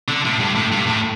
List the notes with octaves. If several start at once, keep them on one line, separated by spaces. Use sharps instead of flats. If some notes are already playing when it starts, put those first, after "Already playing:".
D3
A2
G2
A2
G2
A2